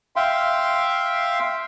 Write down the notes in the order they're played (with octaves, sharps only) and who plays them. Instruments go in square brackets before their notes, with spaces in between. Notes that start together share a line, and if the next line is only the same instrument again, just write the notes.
[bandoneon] E5 F5 G5 C6